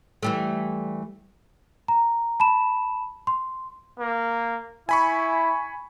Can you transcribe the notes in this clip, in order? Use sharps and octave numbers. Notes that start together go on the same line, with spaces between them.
E3 G3 A3
A#5
A5 B5 E7
C6
A#3
E4 G#5 B5 C#6